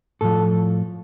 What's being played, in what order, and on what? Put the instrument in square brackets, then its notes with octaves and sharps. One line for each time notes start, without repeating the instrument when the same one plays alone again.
[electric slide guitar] A2 F3 A4